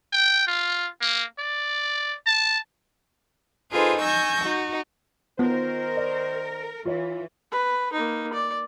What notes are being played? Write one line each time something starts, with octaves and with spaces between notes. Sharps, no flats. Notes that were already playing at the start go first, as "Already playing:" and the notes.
G5
F4
A#3
D5
A5
D#4 F4 G#4 A4 B4 C5
G#5 C#6 E6 G6 A#6
D#4 F#4
D#3 B3 F4 A#4 C5
D5
E3 F4 C#5
B4
A#3 D#4
D5